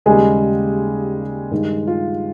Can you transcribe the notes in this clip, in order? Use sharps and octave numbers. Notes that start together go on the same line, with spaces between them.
D#2 C#3 G3 G#3 A#3 G#4
G2 D#3 G#3
F4